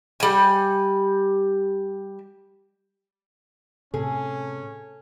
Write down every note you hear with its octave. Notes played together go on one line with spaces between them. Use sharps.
G3 G#5
A2 C3 C#4 G#4 A4